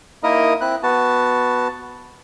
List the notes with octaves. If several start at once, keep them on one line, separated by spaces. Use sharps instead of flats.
A#3 D#4 E4 A#4 D#5
C4 E4 F#6
B3 F#4 A5